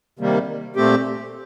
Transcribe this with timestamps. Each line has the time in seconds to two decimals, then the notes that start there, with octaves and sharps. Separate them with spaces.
0.19 C3 D#3 G3 A#3
0.76 A#2 A3 C4 G4